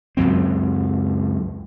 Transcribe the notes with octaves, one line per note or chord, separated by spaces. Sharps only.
C#2 F#2 F#3 C4